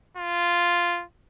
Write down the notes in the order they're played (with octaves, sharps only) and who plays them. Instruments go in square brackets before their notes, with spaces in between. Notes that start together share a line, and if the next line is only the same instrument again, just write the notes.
[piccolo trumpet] F4